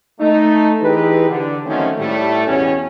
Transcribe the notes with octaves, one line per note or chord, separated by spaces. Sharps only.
A3 D#4
E3 C4 D#4 G4 G#4 B4
D3
D#3 F3 F#3 A3 C4 C#4
A2 G3 A3
E2 G2 B2 C#4